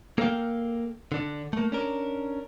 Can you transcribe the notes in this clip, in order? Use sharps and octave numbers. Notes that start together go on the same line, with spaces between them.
A#3 A4 A#4 D#5 F5 G5
D3 D4
A3 A#3
C#4 D4 A#4